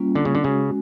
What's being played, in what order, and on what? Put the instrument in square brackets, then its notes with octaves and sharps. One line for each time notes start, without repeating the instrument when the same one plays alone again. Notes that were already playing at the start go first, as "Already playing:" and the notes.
Already playing: [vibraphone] G3 A#3 C#4 F4
[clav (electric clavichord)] D3
C#3
D3
[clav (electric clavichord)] C#3 [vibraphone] G#3 C#4 F#4